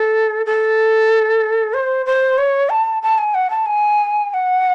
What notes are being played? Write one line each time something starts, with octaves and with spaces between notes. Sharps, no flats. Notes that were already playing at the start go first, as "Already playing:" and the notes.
Already playing: A4
A4
C5
C5
C#5
A5
A5
G#5
F#5
A5
G#5
G#5
F#5